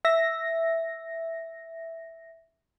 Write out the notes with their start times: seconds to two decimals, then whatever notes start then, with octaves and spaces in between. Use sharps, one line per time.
0.05 E5 A#6